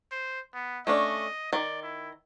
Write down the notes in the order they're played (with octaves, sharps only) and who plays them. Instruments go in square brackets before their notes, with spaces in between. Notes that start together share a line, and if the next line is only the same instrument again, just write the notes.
[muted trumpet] C5
B3
[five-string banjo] A3 C#4 D4 [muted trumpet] D#5
[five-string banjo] D#3 [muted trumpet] D5
[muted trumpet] E4